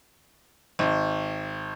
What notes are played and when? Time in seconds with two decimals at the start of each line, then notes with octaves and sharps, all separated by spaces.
0.79 G#1